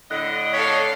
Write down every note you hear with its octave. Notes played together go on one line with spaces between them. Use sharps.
A2 D3 D#5 F#6
A4 C#5 F5 B6